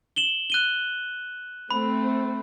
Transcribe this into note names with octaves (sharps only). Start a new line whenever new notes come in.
E7 F#7 G7
F#6 D#7 G7
A3 C4 B5